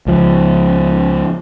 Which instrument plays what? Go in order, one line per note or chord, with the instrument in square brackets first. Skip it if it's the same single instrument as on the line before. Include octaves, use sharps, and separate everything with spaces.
[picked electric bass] C#2 F3